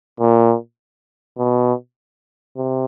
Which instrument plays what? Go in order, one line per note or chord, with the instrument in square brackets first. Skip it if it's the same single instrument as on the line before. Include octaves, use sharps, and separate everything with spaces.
[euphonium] A#2
B2
C3